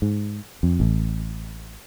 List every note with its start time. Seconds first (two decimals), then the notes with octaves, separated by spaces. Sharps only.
0.02 G#2
0.63 F2
0.80 A1